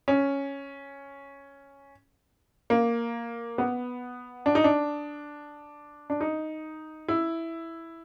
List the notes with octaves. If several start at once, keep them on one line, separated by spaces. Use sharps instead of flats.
C#4
A#3
B3
D4
D#4
D4
D4
D#4
E4